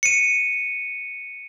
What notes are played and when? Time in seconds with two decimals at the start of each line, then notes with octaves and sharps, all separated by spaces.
0.03 C#7 D#7